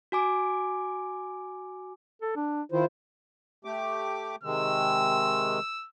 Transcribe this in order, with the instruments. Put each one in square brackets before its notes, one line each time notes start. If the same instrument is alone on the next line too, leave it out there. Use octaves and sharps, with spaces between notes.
[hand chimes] F#4 G#5 D6
[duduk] A4
D4
[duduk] D#3 [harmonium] E4 F4 C5
[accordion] A3 G4 D6
[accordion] C3 D#3 G#3 [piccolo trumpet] E6